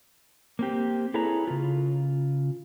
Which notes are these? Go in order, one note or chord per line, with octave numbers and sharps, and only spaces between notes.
A#3 C4 G4
E4 G#4 A4 B4 C#5 A#5
C#3 F4